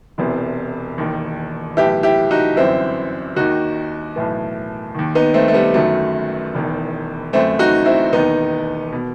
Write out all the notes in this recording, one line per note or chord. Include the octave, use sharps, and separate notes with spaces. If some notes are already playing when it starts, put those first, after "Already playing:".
E1 E2 C3 E3
E1 D#2 D#3
B1 A2 E3 E4 G4
E4 G4
D#4 F#4
G1 F#2 E3 C4 E4
D#2 D#3 D#4 F#4
B1 A2 E3
D#2 D#3
B3 D#4
A3 C4
A3
G3 B3
G1 F#2 D#3 F#3 A3
E1 E2 D#3
G1 F#2 E3 A3 C4
D#4 F#4
C4 E4
E1 D#2 D#3 B3 D#4
B2